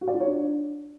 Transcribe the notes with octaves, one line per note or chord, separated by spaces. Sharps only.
F#4
D5
F4
C#5
D4